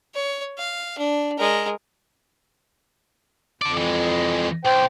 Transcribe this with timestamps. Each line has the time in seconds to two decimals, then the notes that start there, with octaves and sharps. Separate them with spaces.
0.15 C#5
0.58 F5
0.98 D4
1.38 G#3 A#4
3.62 F2 A4 D5
3.77 E3 G#3
4.65 B1 C5 G5